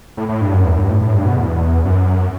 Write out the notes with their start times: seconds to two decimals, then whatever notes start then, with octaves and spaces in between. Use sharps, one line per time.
0.17 A2
0.29 A2
0.41 G2
0.54 F#2
0.65 E2
0.77 G2
0.89 A2
1.01 A2
1.13 G2
1.25 B2
1.37 E2
1.85 F#2